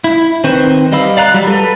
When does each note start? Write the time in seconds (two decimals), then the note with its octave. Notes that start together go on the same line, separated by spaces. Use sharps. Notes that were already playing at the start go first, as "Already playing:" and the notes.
0.04 E4
0.44 D#3 C4 B4 C5 C#6
0.92 G3 D#5 F5 B5 E6
1.17 D5 F5 A#5 F#6
1.34 F#3 G3
1.47 A4 B4